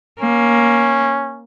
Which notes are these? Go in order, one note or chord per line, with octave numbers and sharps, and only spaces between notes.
A#3 C#4